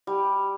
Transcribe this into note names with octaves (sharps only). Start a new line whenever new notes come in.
G3